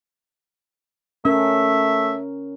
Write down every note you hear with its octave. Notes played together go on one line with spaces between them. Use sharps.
A3 C#4 A#4 E5